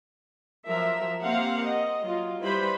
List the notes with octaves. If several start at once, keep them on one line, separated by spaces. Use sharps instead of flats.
F3 F#3 A#4 E5
A#3 C4 G4 F5 F#5
D#5
F#3 F4
G3 E4 B4 C5 B5